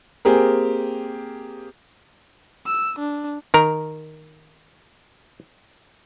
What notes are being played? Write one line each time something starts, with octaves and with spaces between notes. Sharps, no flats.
A#3 C4 G4 G#4 A#4
E6
D4
D#3 A#4